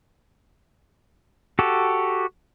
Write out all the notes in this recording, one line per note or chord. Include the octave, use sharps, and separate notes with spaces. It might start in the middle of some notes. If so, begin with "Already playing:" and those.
F#4 G4 A4